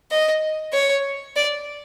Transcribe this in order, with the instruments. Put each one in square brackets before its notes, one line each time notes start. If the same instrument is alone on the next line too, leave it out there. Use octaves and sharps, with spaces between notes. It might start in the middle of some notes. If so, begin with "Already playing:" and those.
[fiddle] D#5
C#5
D5